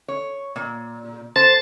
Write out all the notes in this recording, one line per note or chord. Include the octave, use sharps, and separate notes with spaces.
C#5
A#2
C5 A5 A6